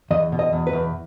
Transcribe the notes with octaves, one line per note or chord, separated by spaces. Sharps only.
E2 D#5
B2
D#5
E2
B4
E2